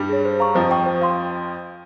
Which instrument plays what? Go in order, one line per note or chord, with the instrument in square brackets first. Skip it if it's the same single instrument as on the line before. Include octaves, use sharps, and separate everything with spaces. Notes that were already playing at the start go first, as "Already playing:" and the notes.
Already playing: [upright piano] G2 G3
[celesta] G#4 C#5
C5
F5 A#5 C#6
[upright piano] F2 F3 [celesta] C5
[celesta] G5 C#6
C5
F5 C6